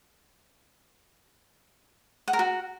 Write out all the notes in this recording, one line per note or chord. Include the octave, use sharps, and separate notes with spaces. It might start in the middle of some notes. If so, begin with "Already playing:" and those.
F#5
A#4
F#4